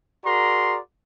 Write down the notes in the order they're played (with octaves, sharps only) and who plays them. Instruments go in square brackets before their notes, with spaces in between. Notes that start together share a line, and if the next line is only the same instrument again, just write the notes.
[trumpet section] F#4 G#4 A#4 D5 A#5 C6